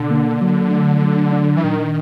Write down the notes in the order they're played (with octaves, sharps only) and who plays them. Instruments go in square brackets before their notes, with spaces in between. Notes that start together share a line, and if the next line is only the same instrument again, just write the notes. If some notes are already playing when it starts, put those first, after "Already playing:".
Already playing: [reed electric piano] B2 [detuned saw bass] D3
[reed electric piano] A#3
F#3
A3
F#3
D4
[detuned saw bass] E3
[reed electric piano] A#2 [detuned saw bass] D#3